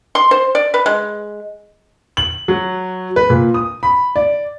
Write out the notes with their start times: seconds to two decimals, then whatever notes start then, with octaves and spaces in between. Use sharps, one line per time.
0.15 C6
0.31 C5
0.55 D5
0.74 B4
0.86 G#3
2.17 F#7
2.48 F#3
3.16 B4
3.30 A#2
3.54 D#6
3.83 B5
4.16 D5